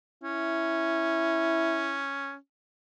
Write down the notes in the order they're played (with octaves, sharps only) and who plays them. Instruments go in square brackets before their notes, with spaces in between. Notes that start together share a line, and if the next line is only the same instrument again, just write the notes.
[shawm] C#4 [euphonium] E4